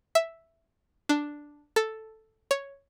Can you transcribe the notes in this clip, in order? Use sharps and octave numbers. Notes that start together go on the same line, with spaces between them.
E5
D4
A4
C#5